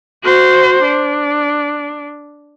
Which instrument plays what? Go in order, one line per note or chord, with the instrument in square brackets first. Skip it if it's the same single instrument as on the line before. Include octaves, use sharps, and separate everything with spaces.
[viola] F#4 C5
D4